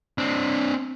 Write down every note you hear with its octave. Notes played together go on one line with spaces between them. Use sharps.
C4 D4